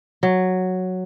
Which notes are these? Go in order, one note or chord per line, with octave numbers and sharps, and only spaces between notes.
F#3